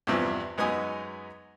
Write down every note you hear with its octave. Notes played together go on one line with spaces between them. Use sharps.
E2 G2 C3 E3 F3
F#2 G#3 B3 D#4 G#5 D#6